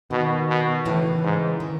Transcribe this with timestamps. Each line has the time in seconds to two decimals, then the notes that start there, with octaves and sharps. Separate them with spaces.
0.11 B2 D#3
0.49 B2
0.85 A2 C#3 E3
1.24 G#2
1.60 D#3